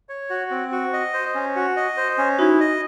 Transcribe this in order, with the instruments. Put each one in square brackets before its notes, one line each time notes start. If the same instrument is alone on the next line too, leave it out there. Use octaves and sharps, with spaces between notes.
[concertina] C#5
F#4
C4
F#4
D#5
C5
C#4
F#4
D#5
C5
C#4
[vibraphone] D#4 F#4 [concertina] E4
[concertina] D#5